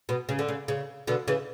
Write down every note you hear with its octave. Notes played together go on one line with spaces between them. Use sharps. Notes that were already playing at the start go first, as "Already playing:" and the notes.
B2
C#3
D3
C#3
C#3
B2 D3
C#3 E3